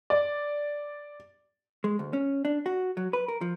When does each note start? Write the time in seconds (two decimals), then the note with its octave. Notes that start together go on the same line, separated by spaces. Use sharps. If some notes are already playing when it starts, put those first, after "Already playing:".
0.10 D5
1.84 G#3
1.99 D2
2.13 C#4
2.45 D4
2.66 F#4
2.97 F#3
3.13 B4
3.28 A#4
3.41 F3